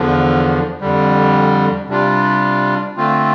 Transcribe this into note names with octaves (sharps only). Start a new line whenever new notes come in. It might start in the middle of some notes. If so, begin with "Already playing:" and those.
Already playing: E2 D3 F3
F2 D3 G3
C3 G3 D4 F4
D3 A3 C4 F4